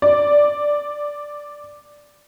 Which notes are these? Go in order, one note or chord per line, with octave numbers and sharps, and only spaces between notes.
D5